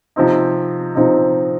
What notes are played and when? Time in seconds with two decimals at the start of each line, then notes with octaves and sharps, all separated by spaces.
0.16 C3 F3 C4 D#4
0.95 C3 F3 C4 D#4